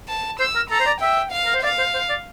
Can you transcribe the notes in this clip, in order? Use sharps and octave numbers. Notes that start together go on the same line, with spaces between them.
A5
C5 E6
A#4
A4 A#5
C5
D5
E5 G5
F5
A#4
C5
D5 F5
C5
C5
D5